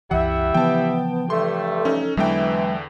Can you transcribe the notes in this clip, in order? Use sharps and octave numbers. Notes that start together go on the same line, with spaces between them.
C2 F#2 E3 G3 E4 E5 F#5
C#3 E3 F3 B3 G5 A5
G2 A3 A4 C6
C#4 D#4
E2 D3 E3 F#3 G#3 E5 G5